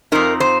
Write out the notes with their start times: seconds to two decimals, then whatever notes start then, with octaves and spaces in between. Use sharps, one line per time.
0.12 F2 F3 C4 D#4 A#4
0.40 C5